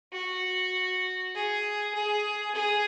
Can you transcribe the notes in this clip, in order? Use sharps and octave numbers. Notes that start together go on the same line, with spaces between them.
F#4
G#4
G#4
G#4